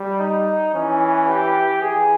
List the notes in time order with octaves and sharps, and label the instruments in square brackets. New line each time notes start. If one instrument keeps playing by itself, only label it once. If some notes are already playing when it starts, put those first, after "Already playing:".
Already playing: [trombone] G3
[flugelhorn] D#4
[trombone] E3 [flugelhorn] C#4
[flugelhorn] G4
[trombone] E3 [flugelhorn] G#4